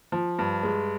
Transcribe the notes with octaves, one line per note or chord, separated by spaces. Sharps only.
F3
G2
G#3